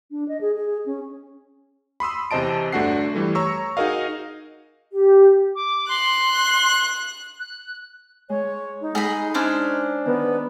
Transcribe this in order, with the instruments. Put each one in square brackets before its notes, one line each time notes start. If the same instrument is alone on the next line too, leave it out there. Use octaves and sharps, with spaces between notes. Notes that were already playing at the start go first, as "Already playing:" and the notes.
[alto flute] D4
D#5
G#4
G#4
C#4
[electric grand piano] B5 C6 D#6 E6
E2 C3 C5 D#5 A5 D7
G1 A3 D4 F#4 F#5 C7
E3 G3 A3
C#5 A#5 C#6 E6
D#4 F#4 G#4 A#4 D#5 F5
[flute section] G4
[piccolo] D6
[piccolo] C6 [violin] F#6
[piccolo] F#6
[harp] G#3 [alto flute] C#5
[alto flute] D#4
[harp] G#3 [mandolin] G#4 D#5 B5
[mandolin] C#4 D4 C5
[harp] D#3 [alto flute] B3